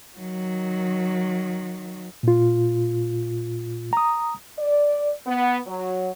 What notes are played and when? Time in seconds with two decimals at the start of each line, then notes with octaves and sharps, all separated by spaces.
0.18 D#3 F#3
2.23 A#2 F4
3.93 A#5 D#6
4.58 D5
5.26 B3
5.67 F#3